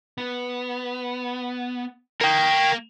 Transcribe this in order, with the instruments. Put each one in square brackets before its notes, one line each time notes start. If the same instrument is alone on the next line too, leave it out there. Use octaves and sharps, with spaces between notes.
[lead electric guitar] B3
[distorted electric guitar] A#3 [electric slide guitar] A#4 G5